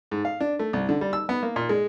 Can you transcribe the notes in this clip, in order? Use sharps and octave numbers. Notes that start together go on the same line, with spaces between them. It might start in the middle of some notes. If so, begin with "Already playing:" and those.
G#2
F5
D4
A3
C2
D3
G3
E6
B3
A#3
A#2
G#3